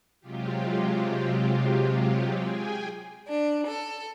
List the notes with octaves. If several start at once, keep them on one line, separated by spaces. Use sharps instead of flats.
C3 F#3 G#3 F4 G4
G#4 G5 G#5
D4
A4